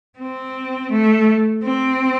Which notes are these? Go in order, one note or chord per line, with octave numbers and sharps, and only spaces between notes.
C4
A3
C4